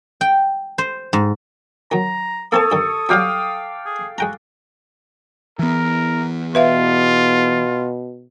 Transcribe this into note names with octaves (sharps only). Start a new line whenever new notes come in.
G5
C5
G#2
D#3 F#3 A#5
A#3 C4 A4 C#5 A5 D#6
G2 D#3
F#3 G3 C#5 F5 G5 D6
G#4
G#3 F#4 G5 A#5
E3 B3 A#4
B2 F4 B4 E5 F5